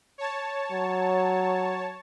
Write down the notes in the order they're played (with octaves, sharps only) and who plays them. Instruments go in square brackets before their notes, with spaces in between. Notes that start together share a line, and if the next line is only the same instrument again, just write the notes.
[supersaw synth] C#5 A5
[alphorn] F#3